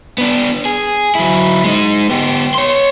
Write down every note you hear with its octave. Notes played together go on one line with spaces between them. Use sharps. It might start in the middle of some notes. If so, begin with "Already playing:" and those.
B3 D4
G#4
F#3 E4
G#3 D#4
B3 G4
C#5 C6